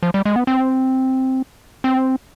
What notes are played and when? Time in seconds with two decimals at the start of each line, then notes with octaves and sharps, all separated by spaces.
0.03 F3
0.14 G3
0.25 G#3
0.36 B3
0.47 C4
1.84 C4